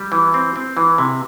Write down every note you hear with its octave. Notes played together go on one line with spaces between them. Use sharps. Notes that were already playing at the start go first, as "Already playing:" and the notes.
Already playing: G3
E3
C4
C4
E3
C3